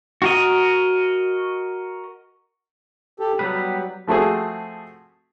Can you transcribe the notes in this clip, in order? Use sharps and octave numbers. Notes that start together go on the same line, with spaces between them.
F#4 A#4 D#5
G4 A4
F#3 G3 B3 B4
F3 A3 C4 F#4 G#4